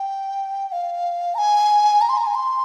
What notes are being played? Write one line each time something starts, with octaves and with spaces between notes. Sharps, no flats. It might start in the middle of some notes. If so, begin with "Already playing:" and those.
Already playing: G5
G5
F5
A#5
G#5
A#5
C6
A#5
G#5
C6